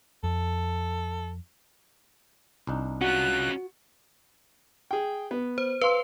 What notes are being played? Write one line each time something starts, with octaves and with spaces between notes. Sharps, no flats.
F2 A4
C2 D4 D#4
C#4 F4 F#4 F#6
G#4 G5
B3
C5
B4 F5 C6